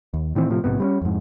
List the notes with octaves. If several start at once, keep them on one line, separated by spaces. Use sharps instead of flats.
D#2
A2 D#3 E3 C4
A2 C3 F3
A#1 G#2 C3 B3
G3 C4 C#4
F2 G#2